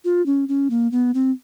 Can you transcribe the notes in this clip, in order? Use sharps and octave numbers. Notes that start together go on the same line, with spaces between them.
F4
C#4
C#4
A#3
B3
C4